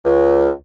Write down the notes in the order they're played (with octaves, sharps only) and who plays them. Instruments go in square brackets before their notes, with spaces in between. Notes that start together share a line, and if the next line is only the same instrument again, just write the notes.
[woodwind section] C#2